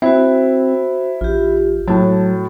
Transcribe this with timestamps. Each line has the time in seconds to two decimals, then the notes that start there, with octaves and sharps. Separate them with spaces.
0.02 C4 E4 F#4 C5
1.21 A#1 F4 G4
1.88 A2 F#3 F#4 A5